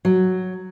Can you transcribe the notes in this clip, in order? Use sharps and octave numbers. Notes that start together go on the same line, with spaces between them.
F#3